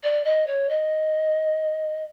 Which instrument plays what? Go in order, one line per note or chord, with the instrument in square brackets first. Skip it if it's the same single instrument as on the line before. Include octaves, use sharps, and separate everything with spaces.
[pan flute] D5
D#5
C#5
D#5